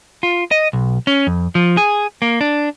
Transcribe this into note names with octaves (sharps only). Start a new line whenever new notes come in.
F4
D#5
B1
C#4
F2
F3
G#4
A#3
D4